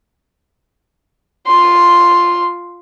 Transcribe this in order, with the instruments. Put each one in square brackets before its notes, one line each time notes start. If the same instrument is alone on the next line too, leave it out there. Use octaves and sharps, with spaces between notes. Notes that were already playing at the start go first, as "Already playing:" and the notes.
[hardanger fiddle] F4 C6